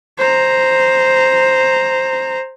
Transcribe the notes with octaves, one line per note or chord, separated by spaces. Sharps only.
C5 A#5